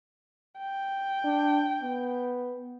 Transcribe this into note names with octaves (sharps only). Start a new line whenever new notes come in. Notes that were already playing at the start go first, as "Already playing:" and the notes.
G5
D4
B3